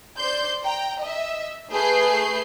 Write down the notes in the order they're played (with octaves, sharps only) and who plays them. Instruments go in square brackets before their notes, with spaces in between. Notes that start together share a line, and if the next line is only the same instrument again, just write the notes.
[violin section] C5 D5 C6 G6
G5 A#5
D#5 E5
A3 G#4 B4 G6 C7